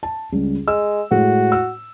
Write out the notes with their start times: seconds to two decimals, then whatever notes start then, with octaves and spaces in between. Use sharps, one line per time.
0.03 A5
0.32 C#2 G3
0.68 G#3 E6
1.11 A2 G#3 F#4
1.52 E6